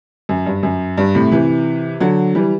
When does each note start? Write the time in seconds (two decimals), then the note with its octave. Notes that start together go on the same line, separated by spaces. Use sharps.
0.29 F#2
0.46 G2
0.63 F#2
0.98 G2
1.15 A2 C3
1.32 C3 E3
2.00 D3 F#3
2.35 E3 G3